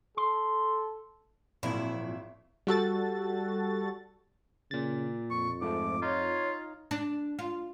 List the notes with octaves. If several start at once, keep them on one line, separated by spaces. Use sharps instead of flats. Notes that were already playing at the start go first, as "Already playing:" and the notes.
A4 C6
G#1 A#2 F3 F#3 E4
G3 F#4 A4 A6
A#2 C#3 A6
F2 C#6
G#2 F3 A3 D6
D#4 F4 C#5
D4
F4